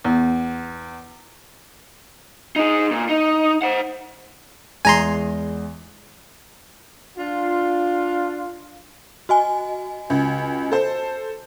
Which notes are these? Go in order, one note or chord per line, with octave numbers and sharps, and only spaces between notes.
E2
D#4 G#4
A#2
D#4
C5 F#5
E2 G#3 G#5 A#5 C6
D4 F4
F#4 D#5 G#5
C#2
A4 C5